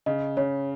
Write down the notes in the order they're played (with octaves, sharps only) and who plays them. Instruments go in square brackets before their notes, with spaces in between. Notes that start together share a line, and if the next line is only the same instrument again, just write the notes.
[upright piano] C#3 [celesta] D#5
[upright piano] C#3 [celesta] C#5